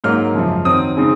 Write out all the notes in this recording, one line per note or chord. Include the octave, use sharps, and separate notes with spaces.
G#2 F#3 A#3 F6
F#2 C#3 F3
D#3 F#3 C4 D#4 D#6
C#3 G#3 C4 D#4